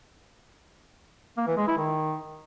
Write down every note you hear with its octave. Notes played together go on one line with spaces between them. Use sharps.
A#3
E3
G#3
E4
D#3